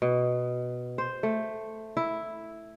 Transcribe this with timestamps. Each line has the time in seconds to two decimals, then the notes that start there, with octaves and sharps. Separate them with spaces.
0.02 B2
0.98 C5
1.23 A3
1.97 E4